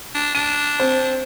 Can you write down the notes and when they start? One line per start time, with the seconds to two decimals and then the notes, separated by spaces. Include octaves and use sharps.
0.15 D4
0.35 D4 D#7
0.80 C4